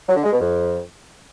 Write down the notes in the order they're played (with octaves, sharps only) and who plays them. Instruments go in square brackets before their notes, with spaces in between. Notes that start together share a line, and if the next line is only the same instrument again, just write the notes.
[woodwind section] F#3
D3
G#3
B2
F2